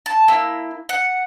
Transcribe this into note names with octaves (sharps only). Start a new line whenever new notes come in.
A5
A#3 E4 E6
F#5